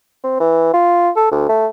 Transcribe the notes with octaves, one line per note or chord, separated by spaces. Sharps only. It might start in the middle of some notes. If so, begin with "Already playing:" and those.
C4
E3
F4
A4
D2
A3